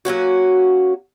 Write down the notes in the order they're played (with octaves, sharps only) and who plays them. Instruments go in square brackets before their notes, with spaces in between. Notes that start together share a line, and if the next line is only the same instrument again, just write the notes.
[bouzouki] F#3 A#3 C#4 F#4